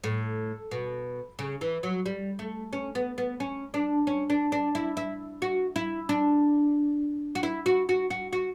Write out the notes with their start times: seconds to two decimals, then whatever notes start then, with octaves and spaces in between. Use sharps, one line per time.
0.04 A2
0.71 B2
1.39 C#3
1.61 E3
1.83 F#3
2.06 G3
2.39 A3
2.73 C#4
2.95 B3
3.18 B3
3.40 C#4
3.74 D4
4.07 C#4
4.30 D4
4.52 D4
4.75 E4
4.97 E4
5.42 F#4
5.76 E4
6.09 D4
7.35 F#4
7.43 E4
7.66 F#4
7.89 F#4
8.10 F#4
8.33 F#4